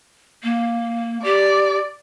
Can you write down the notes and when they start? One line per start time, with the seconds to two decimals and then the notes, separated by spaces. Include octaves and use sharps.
0.43 A#3
1.24 G4 D5